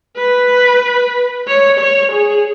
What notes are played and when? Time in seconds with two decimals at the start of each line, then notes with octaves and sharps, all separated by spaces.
0.17 B4
1.47 C#5
1.80 C#5
2.12 G#4